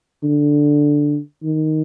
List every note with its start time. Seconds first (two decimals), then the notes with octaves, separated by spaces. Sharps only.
0.24 D3
1.43 D#3